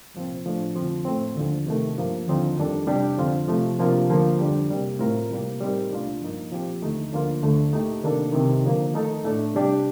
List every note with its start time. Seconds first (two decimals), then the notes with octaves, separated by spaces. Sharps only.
0.14 C2 A#2 F3 C4
0.44 A2 F3 A3 D4
0.76 F2 D3 F3 C4 F4
1.05 A2 A3 C4
1.36 D#2 D3 F3
1.66 C3 D#3 A3
1.96 G2 F3 A#3
2.27 D#2 D3 F3 C4 D#4
2.57 F2 D#3 G3 D4 A4
2.87 C3 G3 D4 G4
3.17 F2 D3 F3 C4 F4
3.48 C3 F3 A3
3.79 C3 F3 A#3 D4 F4
4.09 D2 D3 F3 A#3
4.39 F2 D3 G3 D4 G4
4.70 C3 G3 A#3
4.99 A2 A3 C4 F4 A#4
5.30 C3 G3 A#3
5.61 A2 G3 C4 D#4 A#4
5.91 C2 A#2 A3 D4 F4
6.21 G2 F3 A#3 D#4
6.52 A#2 F3 C4 G4
6.82 D#2 D3 A3 D#4
7.12 D2 D3 F3 A#3 F4
7.42 D2 D3 A3
7.73 A#2 A3 D#4 G4
8.03 C3 D#3 A#3 D4 A4
8.33 C2 C3 D#3
8.64 D3 F3 A#3
8.94 D#3 A3 D#4 A4
9.24 A2 A3 D4
9.54 C3 G3 D4 G4